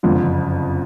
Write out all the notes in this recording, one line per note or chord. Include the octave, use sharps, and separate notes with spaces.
F#1 F2 D3 F3